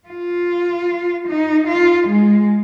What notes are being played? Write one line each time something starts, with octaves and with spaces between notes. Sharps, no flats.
F4
D#4
F4
G#3